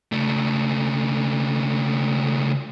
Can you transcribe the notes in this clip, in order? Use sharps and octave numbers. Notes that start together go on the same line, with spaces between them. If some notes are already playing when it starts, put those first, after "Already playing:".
C#2 A3